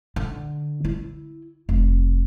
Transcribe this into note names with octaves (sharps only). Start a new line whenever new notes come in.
D3
E4
F1